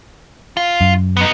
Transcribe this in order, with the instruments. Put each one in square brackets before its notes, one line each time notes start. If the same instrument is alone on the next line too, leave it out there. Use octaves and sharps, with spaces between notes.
[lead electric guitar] F4
[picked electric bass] F#2
[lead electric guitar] B3 D#4